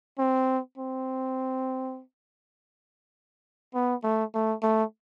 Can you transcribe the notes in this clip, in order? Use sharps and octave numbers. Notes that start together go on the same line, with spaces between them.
C4
C4
B3
A3
A3
A3